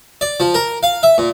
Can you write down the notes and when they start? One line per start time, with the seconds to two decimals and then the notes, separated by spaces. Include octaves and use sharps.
0.21 D5
0.40 F3
0.54 A#4
0.83 F5
1.03 E5
1.18 A#2